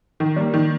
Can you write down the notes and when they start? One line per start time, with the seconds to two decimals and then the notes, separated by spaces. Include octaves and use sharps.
0.20 D#3
0.36 G3 A#3
0.54 D#3